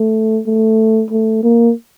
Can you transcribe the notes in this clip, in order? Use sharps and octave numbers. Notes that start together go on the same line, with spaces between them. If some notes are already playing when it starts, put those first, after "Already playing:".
Already playing: A3
A3
A3
A#3